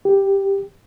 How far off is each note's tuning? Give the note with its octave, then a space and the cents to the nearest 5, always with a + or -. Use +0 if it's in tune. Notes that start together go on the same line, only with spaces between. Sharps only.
G4 +5